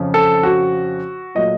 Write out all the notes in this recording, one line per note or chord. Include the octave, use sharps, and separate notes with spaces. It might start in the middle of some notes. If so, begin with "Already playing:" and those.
Already playing: F2 C#3 F3
A4
F#4
A#2 F#3 A3 D#5